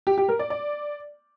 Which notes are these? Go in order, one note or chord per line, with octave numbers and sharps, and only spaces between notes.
G4
G4
A#4
D5
D5